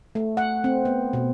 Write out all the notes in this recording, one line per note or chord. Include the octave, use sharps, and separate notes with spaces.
A3
F#5
C4
B3
B2